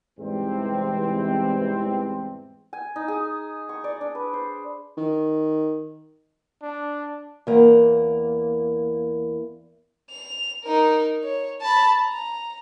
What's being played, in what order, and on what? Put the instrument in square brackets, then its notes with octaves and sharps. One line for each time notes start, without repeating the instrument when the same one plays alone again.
[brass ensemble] E2 G#2 C3 E3 G3 C4
[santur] G#5
D#4
G#4
C#6
D5
D4
B4
C5
[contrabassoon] D#3
[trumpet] D4
[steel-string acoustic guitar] E2 A#3
[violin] F7
D#4 A#4
C#5
A5 B5
A#5